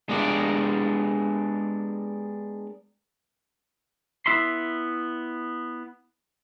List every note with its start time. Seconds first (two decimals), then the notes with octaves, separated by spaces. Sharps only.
0.09 G#3 B3 D4 G4 A#4 D5
4.26 B3 E4 E5 B5 C6